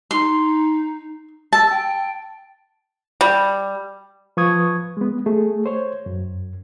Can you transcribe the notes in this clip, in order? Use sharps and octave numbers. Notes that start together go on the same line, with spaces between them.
D#4 C6
A5 E6
G5
G3
F3 B4 C#6 D#6 G#6
G#3 B3
A3 G#4
C5 C#5
F#2